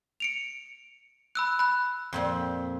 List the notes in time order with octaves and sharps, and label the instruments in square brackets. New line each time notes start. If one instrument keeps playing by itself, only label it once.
[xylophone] C#7 D7 F7
B5 E6 F#6
B5 F#6
[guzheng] F2 A#2 C4